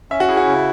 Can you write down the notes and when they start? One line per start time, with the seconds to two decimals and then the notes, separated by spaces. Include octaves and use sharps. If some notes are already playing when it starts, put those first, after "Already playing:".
0.11 C#4 E5
0.20 F#4
0.28 E4 G#4
0.37 F#4
0.47 C#3